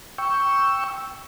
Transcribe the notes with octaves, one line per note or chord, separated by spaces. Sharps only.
G5 C#6 E6